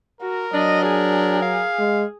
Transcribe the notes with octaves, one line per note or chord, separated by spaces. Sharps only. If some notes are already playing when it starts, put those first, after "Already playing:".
F#4 A#4
F#3 D4 D#5
G#4
F5
G#3